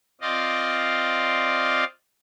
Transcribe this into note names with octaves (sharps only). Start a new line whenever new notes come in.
C4 F4 D5 D#5 F5